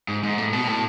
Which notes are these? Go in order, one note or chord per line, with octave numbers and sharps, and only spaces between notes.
G#2
G#2
A2
B2
A2